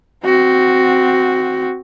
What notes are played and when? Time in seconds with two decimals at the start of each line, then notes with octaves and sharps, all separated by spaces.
0.24 C4 F#4